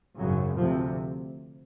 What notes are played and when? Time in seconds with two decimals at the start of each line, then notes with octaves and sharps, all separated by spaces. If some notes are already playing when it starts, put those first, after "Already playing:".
0.17 G#1 F#2 C#3 F#3
0.56 D2 C3 F3